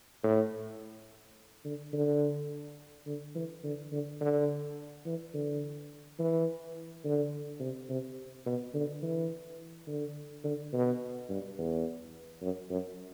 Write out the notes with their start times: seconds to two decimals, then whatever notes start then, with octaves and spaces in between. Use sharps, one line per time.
0.24 A2
1.65 D3
1.93 D3
3.07 D3
3.35 E3
3.64 D3
3.92 D3
4.21 D3
5.06 E3
5.34 D3
6.19 E3
7.04 D3
7.60 C3
7.90 C3
8.46 B2
8.75 D3
9.03 E3
9.87 D3
10.44 D3
10.73 B2
11.29 G2
11.58 E2
12.42 F#2
12.70 F#2